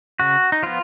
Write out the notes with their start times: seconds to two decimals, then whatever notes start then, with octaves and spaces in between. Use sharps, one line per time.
0.20 C#3 F#4
0.52 D#4
0.63 F3 B3 F4